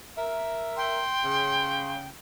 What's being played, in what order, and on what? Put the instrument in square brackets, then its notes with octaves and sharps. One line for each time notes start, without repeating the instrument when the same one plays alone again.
[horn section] A#4 E5
[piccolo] G5 [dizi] C6
[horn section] C#3